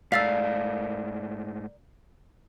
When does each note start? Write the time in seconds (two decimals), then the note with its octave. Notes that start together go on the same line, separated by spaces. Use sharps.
0.12 G#2 A3 A#4 D5 F5 E6 A6 B6